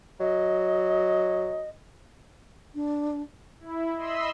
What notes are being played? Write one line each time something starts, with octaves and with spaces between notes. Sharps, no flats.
F#3 D#5
D4
E4
D#5 E5 B5 C6 E6